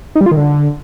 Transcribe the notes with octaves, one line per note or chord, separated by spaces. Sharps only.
D#4
G3
F4
D#3
D3